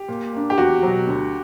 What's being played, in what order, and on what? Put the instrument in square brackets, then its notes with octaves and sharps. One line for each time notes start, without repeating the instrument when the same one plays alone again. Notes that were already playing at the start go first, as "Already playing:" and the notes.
Already playing: [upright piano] G4
[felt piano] A#2
A#3 D4
[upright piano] G4
[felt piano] E2 [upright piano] F#4
[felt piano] B2 F#3
D2